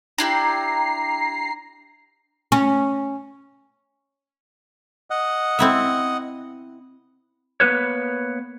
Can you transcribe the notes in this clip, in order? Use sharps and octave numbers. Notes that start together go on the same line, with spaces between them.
D4 E4 G4 A#5 C7
C#4
D#5 F#5
C4 E4 E5
A#3 B3 B4 C#5